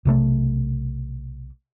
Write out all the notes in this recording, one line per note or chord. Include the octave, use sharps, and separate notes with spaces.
B1 C3 F3 A3